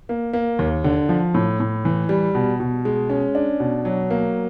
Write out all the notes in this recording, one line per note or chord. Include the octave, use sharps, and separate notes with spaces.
A#3
A#3
D#2
D3
F3
A2
A2
E3
G3
B2
B2
G#3
C#4
D4
B2
F#3
A#3